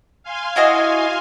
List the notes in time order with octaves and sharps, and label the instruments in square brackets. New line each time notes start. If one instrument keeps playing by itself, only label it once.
[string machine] F5 G#5 C6
[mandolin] E4 F#4 D#5